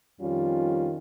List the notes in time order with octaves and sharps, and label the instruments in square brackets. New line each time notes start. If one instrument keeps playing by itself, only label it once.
[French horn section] F2 D#3 G3 C#4 F4